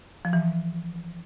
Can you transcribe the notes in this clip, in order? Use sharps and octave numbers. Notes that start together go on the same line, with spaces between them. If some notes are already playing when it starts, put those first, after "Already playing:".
F3
E3